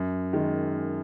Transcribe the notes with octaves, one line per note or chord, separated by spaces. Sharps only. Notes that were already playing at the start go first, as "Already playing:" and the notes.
Already playing: F#2
D#3 G#3